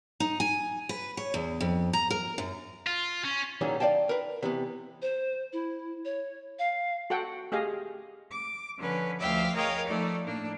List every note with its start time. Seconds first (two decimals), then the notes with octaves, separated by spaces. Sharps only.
0.20 D#4
0.40 G#5
0.89 B4
1.17 C#5
1.34 E2
1.61 F2
1.93 A#5
2.10 A#4
2.38 F#2
2.87 F4
3.25 C#4
3.61 A#2 D#3 E3 F#3 C#4 G#4
3.80 D5 D#5 F5 G5 A5
4.09 A#4 B4
4.42 C3 E3 B3
5.02 C5
5.53 E4
6.05 C#5
6.59 F5
7.10 F#4 A4 F#5 G5
7.52 A3 G4 G#4 D#5 F5
8.32 D6
8.79 D3 F3 C#4 B4
9.19 D2 F3 E5 F5 G5 D6
9.55 G#4 A#4 C#5 D#5 F5 G5
9.87 F3 A3 D#4 D5
10.26 A2 A#3 D4